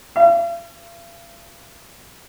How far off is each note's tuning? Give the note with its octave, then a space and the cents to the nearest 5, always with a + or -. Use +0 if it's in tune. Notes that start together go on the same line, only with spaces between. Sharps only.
F5 -45